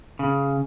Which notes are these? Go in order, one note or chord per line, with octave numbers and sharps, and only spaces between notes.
C#3